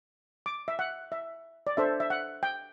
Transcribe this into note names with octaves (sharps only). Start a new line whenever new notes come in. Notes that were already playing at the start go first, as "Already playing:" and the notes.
D6
E5
F#5
E5
D5
D4 A4 C5 E5
E5
F#5
G5